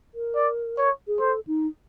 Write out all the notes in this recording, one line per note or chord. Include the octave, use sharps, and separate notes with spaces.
A#4
D5
C#5
G#4
A4 C5
D#4